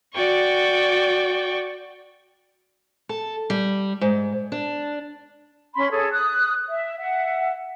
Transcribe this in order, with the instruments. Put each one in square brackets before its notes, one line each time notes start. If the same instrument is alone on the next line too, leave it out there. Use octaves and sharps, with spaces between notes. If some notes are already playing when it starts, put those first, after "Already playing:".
[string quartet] F#4 D5 G5 C#6
[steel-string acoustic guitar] A4
G3
G#2
D4
[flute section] C#4 B5 C6
G#4 A4 C#5
D#6 F#6
E5
E5 F#5